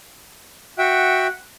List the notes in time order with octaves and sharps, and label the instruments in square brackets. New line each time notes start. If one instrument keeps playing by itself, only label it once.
[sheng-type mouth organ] F#4 E5 G5 [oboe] F#5